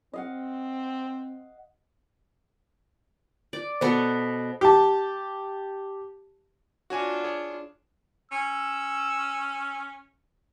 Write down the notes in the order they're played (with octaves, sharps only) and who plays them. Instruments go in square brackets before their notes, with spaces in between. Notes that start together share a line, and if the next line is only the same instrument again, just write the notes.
[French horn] C4 [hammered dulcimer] D#5 F5 F#5
[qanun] D5
[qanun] B2 B3 A4 [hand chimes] C5
[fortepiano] G4 A5
[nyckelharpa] D4 F4 [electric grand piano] F#4 C#5 G#5
[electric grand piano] G#4 C#5
[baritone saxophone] C#4 [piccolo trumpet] E6